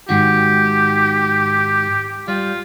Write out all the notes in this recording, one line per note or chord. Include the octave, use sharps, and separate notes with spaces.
G#2 D#3 F#4 G4
G3 F4